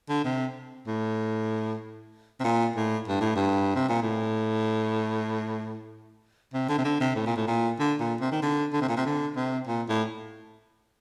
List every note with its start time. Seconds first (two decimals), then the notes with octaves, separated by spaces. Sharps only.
0.09 D3
0.24 C3
0.87 A2
2.40 C3
2.44 A#2
2.76 A2
3.08 G2
3.21 A2
3.35 G2
3.76 C3
3.89 A#2
4.02 A2
6.54 C3
6.69 D3
6.78 C3
6.85 D3
7.00 C3
7.16 A2
7.26 A#2
7.37 A2
7.47 A#2
7.79 D3
8.00 A#2
8.21 C3
8.32 D#3
8.42 D3
8.73 D3
8.81 C3
8.89 A#2
8.96 C3
9.05 D3
9.36 C3
9.67 A#2
9.89 A2